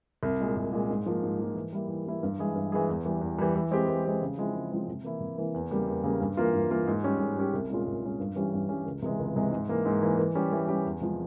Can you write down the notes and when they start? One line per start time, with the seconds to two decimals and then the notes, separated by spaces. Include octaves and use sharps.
0.23 C2
0.40 A#2 G#3
0.57 C2
0.73 A#2 G#3
0.90 G#2
1.06 F3 A#3
1.23 G#2
1.40 F3 A#3
1.55 E3
1.72 G3 A#3 E4
1.88 E3
2.06 G3 A#3 E4
2.23 G2
2.39 E3 G#3 E4 G#4
2.55 G2
2.72 E3 G#3 E4 G#4
2.89 E2
3.05 E3 G3
3.21 E2
3.38 E3 G3
3.56 E3
3.71 G#3 C4 G4
3.88 E3
4.05 G#3 C4 G4
4.22 C#3
4.38 F3 G#3 C4 E4
4.54 C#3
4.71 F3 G#3 C4 E4
4.88 C3
5.04 E3 A#3 E4
5.20 C3
5.37 E3 A#3 E4
5.54 E2
5.71 C#3 G3 A#3
5.87 E2
6.03 C#3 G3 A#3
6.20 G2
6.37 E3 A#3 F4
6.54 G2
6.70 E3 A#3 F4
6.87 G#2
7.03 G3 C#4 G4
7.20 G#2
7.36 G3 C#4 G4
7.54 C2
7.70 A#2 G#3 C#4 F4
7.87 C2
8.03 A#2 G#3 C#4 F4
8.20 G2
8.36 E3 G3 C#4 G4
8.53 G2
8.69 E3 G3 C#4 G4
8.86 C#2
9.02 C3 E3 G#3
9.19 C#2
9.36 C3 E3 G#3
9.52 G#2
9.69 E3 A#3
9.86 G#2
10.02 E3 A#3
10.19 E3
10.35 G3 C#4 G4
10.52 E3
10.68 G3 C#4 G4
10.85 E2
11.01 C3 F3 G#3